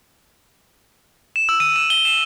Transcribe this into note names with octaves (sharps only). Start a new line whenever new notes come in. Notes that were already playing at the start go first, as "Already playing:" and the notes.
E7
E6
D#7
E7
G7
E7